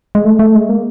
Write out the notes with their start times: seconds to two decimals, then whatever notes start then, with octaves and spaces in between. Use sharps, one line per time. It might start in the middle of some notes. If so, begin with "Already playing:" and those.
0.15 G#3
0.25 A3
0.39 A3
0.55 G#3
0.69 A#3